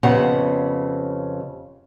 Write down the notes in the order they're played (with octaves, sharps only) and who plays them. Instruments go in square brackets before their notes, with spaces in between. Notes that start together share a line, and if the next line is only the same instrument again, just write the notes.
[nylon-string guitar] F2 C#3 B3 G4 F#5